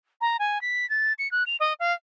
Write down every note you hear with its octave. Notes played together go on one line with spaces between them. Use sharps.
A#5
G#5
B6
A6
C#7
F#6
F7
D#5
F5